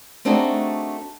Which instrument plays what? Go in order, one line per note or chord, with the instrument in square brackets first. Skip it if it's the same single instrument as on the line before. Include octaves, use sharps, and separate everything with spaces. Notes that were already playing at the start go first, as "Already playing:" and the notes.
[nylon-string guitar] A3 C4 D4 D#4 F#4 G#4